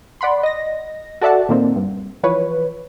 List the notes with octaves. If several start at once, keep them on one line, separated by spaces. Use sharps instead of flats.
D5 F#5 B5 C6
D#5 A#6
F#4 A4 D5 E5 F#5 A5
A#2 D#3 A#3 C4
G2
E3 F3 B4 C#5